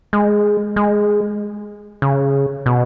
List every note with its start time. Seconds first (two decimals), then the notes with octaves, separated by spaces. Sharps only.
0.13 G#3
0.76 G#3
2.02 C#3
2.66 B2